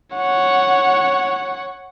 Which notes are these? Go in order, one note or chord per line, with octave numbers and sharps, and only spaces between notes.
C#5 F#5